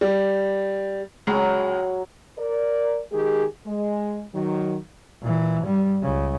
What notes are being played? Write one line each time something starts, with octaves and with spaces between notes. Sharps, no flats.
G3
C#2 F#3 G#3
A#4 D5
D#3 G#3 G4 G#4
G#3
D#3 F#3
A#2 E3
G2 G3
C#2 C#3